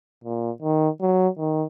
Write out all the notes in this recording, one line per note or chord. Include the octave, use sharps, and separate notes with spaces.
A#2
D#3
F#3
D#3